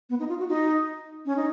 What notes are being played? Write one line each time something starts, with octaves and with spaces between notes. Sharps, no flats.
B3
D#4
F4
F#4
D#4
C#4
D#4